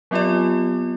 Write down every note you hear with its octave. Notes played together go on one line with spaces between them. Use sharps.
F#3 B3 C4 F4 G4 D5